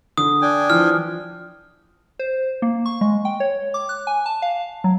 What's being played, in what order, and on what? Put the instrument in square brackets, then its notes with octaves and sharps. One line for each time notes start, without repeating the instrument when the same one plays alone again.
[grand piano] D3 [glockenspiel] D#6
[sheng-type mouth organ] D4 G5 G#5
[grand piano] E3 F3 [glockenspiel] F6
[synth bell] C5
A#3
C#6
G#3
G5
C#5
D6
F#6
G#5
A5
F5
F#3